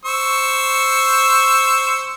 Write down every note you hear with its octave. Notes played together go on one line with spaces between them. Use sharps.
C5 C#6 E6